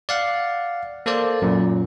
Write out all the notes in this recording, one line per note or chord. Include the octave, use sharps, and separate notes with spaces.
D5 F5 F#5
A#3 A4 C5 D5
F#2 A#2